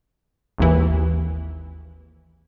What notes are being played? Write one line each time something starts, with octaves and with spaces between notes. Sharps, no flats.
G#1 D#2 E3